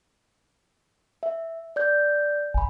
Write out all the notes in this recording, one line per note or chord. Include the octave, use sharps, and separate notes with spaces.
E5
D5 G6
G1 G#5 B5